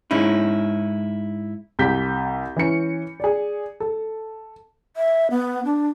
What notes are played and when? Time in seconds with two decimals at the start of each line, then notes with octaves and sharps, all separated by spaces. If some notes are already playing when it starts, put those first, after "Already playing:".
0.11 G#2 C#4 D#4 E4
1.79 C2 G4 G6 B6
2.56 E3 C#4 C#7
3.20 G#4 D5
3.80 A4
4.97 E5
5.31 B3
5.65 D4